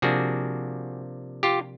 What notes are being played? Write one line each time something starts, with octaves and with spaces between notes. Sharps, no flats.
C3 F3 A#3 D4 F#4 G#4
F4 G4